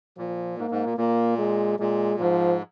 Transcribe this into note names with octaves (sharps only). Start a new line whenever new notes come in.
A#2 F3
G#2 A#3
G#2
A#2
A#2 A#3
G#3
A#2 G#3
G#2 F3